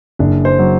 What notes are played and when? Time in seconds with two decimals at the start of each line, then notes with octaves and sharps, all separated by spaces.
0.19 F#1 D4
0.45 C5
0.59 F#3